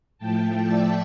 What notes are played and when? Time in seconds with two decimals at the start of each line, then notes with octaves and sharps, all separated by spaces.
0.18 A2 F3 A3 G5 A5
0.66 D5 E5